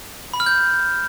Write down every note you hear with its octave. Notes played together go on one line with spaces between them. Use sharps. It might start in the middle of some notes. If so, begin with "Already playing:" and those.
B5
F6
G6